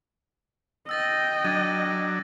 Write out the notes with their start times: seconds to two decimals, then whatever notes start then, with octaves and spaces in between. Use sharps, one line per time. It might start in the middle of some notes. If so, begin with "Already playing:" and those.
0.89 D#5 G5 E6 A6 A#6
1.44 F#3 D4 G#6 A6 D#7